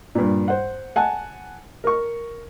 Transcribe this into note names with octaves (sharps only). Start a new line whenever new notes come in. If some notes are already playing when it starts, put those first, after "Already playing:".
G2 A#2
C5 F#5
F#5 G#5 A5
A#4 C#6